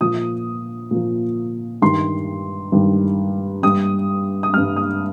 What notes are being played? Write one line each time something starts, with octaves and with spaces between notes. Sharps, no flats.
A#2 F3 D#6
A#2 F3
G2 D#3 G3 C6
G2 D#3 G3
G2 G3 D#6
D#6
G2 G3 F6
D#6